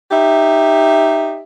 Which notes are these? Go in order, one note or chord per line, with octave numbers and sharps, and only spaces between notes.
D#4 G4 E5